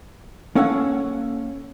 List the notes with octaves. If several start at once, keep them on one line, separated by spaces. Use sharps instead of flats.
A#3 C#4 A4 C#5 F5 F#5